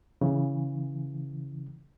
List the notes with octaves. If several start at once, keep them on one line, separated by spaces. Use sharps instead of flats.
C#3 E3